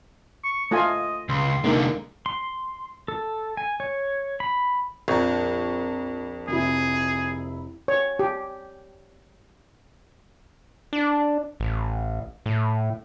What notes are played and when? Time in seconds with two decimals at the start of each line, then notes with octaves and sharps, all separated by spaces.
0.43 C#6
0.71 A3 F4 D#5 G#5
1.29 C#2 C6
1.64 C2 D3 G#3 A#3 D#4
2.26 C6
3.08 A4
3.57 G#5
3.80 C#5
4.40 B5
5.08 A#1 F2 A#5 C#6
6.48 F1 E4 G#4
7.88 C#5
8.19 G4
10.93 D4
11.60 A1
12.46 A2